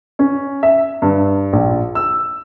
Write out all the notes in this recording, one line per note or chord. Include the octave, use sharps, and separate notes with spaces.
C#4
E5
G2
A#1
E6